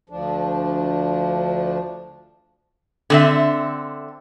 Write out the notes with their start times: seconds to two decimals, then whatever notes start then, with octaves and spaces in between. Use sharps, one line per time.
0.10 D2 F3 D4
3.10 D3 C4 E5